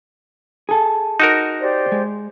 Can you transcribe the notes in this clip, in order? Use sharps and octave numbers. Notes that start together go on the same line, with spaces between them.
G#4 A4
D#4 F#4 A#4
G4 C5 D5
G#3